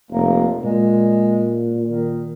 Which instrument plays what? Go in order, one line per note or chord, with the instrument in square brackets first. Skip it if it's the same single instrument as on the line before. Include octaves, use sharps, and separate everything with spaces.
[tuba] F1 [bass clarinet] A#3
[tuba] A#2 [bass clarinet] G#3
[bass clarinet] D#3